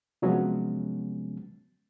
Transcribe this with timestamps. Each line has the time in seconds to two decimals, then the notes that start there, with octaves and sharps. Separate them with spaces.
0.22 C3 F3 F#3 G#3 B3 C#4